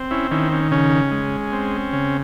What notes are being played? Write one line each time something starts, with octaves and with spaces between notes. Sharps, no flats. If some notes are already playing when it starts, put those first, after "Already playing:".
Already playing: C4
C#4 E4
D#3 C#4 E4
C#4
C#3 C#4
G#3
C4
C#3